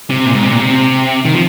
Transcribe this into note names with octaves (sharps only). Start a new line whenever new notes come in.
C3
A#2
G#2
C3
A#2
C3
D#3
F3